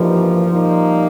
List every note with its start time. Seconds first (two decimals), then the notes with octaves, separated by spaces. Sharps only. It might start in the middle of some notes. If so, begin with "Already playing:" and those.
Already playing: G2 E3 F3 G3 A#3 D#4
0.49 A#2 G3 A#3 D#4